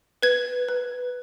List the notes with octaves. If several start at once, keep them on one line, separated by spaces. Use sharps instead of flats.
B4 G#6
B4